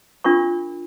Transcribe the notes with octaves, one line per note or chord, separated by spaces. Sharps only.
D4 F4 A#4 C#6